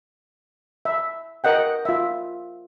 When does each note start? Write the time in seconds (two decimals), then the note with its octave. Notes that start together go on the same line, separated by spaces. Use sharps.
0.85 E5
1.44 A#4 D#5 F#5 G5
1.85 F4 E5